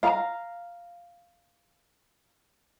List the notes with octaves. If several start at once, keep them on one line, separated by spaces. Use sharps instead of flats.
F5 A#5